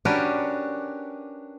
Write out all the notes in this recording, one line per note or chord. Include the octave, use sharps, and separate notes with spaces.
C#4 D4 F#4 G4 A#4 B4